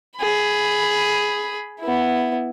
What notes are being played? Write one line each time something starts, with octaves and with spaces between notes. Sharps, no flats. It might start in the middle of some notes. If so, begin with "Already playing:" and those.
G#4 B5
B3 E4